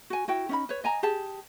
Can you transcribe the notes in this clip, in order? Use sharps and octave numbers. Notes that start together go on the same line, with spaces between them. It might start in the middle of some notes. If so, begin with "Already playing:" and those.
F#4 G#5
E4 F#4 G5
C#4 D#4 B5
B4 C#5
D#5 G#5 A#5
G4 G#4 A5